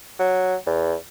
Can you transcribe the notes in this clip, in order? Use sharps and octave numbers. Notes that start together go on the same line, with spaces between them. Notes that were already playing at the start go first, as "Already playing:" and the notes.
F#3
E2